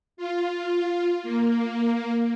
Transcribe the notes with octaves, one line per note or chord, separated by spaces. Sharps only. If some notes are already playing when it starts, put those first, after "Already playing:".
F4
A#3